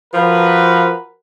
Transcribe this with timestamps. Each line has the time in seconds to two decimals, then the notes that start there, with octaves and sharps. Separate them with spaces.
0.14 F3 F#4 A#4 B4